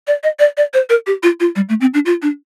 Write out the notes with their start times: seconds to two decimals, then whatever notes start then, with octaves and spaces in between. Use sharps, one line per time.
0.07 D5
0.23 D#5
0.39 D5
0.57 D5
0.74 C5
0.90 A#4
1.07 G4
1.23 F4
1.40 F4
1.56 G3
1.69 A3
1.81 C4
1.94 D4
2.06 F4
2.22 D4